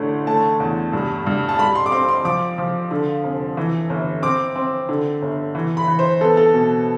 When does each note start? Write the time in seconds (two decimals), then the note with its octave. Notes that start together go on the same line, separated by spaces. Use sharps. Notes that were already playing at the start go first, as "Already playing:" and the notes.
Already playing: A1 D3 A3
0.27 A3 A5
0.60 E2
0.93 G2
1.27 G2
1.49 A5
1.59 G3 B5
1.75 C6
1.86 D6
1.92 C4 C6
2.09 C6
2.25 F3 D6
2.58 F3
2.91 D3
3.24 F1
3.57 E3
3.90 G1
4.22 C4 D6
4.56 C4
4.89 D3
5.22 G1
5.55 E3
5.77 B5
5.88 E3
5.99 C5
6.21 B3 A4
6.37 A4
6.54 B2